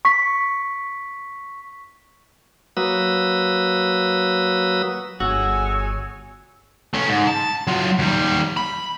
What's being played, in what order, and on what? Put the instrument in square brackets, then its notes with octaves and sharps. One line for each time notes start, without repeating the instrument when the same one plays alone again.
[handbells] C#6 B6
[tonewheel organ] F#3 A#3 F#4 B4 D#6 E6
[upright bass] G1 [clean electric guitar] F#4 [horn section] G#4 C#5 G#5 [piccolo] E6
[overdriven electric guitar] A3 C#4
G#2
A5
F#3 F4
D#2 G3
B5